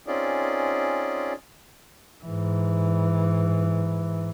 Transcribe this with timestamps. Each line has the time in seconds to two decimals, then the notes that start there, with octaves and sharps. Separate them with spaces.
0.07 C4 C#4 D#4 F4 G#4 D5
2.24 G#2 E3